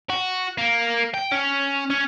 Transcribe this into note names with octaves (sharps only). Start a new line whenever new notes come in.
F#4
A#3
G5
C#4
C#4